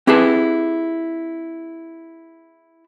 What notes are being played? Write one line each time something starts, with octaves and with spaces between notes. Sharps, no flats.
C4 E4 G4 G#4 B4 A5